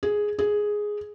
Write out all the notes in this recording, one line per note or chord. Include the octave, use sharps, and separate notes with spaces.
G#4
G#4